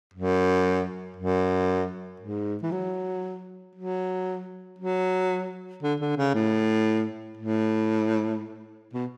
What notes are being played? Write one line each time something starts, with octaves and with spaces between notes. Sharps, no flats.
F#2
F#2
G#2
E3
F#3
F#3
F#3
D3
D3
C#3
A2
A2
B2